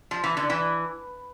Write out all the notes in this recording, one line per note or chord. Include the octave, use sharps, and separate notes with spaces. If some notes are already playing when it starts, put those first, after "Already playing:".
F3
E3
D3
E3